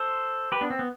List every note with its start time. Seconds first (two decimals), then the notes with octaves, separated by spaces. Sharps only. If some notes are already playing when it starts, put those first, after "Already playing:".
Already playing: A4 C5
0.52 G4 B4
0.61 B3 D4
0.70 C4
0.79 B3